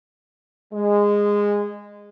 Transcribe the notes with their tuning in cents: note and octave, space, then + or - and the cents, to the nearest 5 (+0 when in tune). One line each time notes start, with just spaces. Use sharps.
G#3 -15